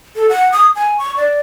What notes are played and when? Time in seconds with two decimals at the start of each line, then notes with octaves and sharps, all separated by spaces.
0.16 A4
0.29 F#5
0.52 D#6
0.75 G#5
0.98 C#6
1.17 D5